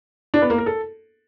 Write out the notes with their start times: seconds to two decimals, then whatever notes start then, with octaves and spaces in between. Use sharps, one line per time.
0.34 D4
0.42 B3
0.50 A#3
0.58 A#4
0.66 A4